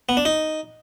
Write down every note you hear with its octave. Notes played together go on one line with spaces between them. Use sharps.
B3
D4
D#4